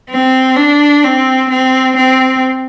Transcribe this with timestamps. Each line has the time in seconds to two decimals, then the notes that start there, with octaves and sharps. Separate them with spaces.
0.10 C4
0.56 D4
1.04 C4
1.50 C4
1.97 C4